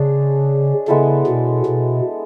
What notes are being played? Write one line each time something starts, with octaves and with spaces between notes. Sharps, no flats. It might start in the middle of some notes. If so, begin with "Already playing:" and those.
Already playing: C#3 G#3 D4 G#4 C#5
C#3 G#3 B3 E4 A4
B2
B2